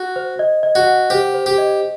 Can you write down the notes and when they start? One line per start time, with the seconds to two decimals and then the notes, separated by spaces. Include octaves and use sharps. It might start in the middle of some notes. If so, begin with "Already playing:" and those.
Already playing: F#4
0.16 C5
0.39 D#5
0.63 D#5
0.75 F#4
0.87 F#5
1.10 G4 C5
1.34 C5
1.46 G4
1.58 D#5